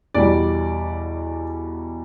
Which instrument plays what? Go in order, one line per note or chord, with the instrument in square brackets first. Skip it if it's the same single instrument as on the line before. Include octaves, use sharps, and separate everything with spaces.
[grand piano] E2 B2 G3 D5